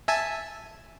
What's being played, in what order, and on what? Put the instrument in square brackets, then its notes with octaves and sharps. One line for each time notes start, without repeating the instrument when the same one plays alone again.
[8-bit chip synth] E5 G#5 A5